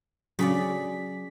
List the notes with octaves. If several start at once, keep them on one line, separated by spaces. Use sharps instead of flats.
C#3 F#3 C#4 D5 B6